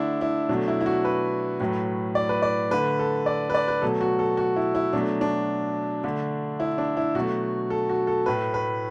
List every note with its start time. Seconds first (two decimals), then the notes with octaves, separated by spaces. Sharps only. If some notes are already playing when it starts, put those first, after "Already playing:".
Already playing: D3 A3 D4 E4 A4
0.21 E4
0.49 B2 F#3 A3 D4
0.68 E4
0.81 E4
0.86 F#4
1.05 B4
1.60 A2 F#3 A3 B4
2.15 D5
2.29 B4
2.42 D5
2.71 D3 A3 B4
2.99 A4
3.26 D5
3.50 B4
3.54 D5
3.68 B4
3.82 B2 F#3 A3 A4
4.01 F#4
4.19 A4
4.37 F#4
4.56 E4
4.75 E4
4.93 B2 F#3 A3 D4
5.21 D4
6.04 D3 A3
6.60 E4
6.78 D4
6.97 E4
7.15 B2 F#3 A3 F#4
7.70 A4
7.90 F#4
8.07 A4
8.26 A2 A3 B4
8.54 B4